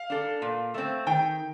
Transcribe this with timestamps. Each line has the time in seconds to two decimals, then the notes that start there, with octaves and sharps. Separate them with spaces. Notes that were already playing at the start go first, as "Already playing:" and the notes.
Already playing: F5
0.10 D4 A4
0.42 A#2
0.74 A3 C4
1.07 D#3 G5